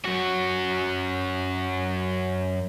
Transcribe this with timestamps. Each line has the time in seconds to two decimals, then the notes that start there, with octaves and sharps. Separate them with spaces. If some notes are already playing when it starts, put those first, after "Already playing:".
0.05 F#2 F#4